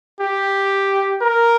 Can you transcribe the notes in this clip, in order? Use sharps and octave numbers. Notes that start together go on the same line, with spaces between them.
G4
A#4